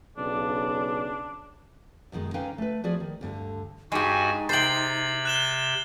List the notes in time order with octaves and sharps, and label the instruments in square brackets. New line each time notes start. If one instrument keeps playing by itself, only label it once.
[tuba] B1 [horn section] C#3 D5 [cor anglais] D4
[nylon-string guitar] F#2 B2 D#3 G#3
D3 C#4 D#4 B4 F5 G5
A3 B4
F3 B3 F#4 G#4 D5
D#3
D2 G2 D3
[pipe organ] G2 F#4 G#5 [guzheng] G#3 G4 [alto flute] D#4
[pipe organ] C3 [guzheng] C5 G5 [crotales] A6 C7 F#7
[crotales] F#6 E7 G7